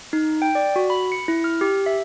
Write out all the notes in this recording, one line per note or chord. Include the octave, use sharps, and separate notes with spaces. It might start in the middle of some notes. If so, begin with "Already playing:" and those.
D#4
G5
D5
F#4
B5
C#7
E4
F6
G4
E5